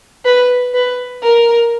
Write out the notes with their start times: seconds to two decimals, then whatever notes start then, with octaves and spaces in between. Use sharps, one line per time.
0.25 B4
0.74 B4
1.23 A#4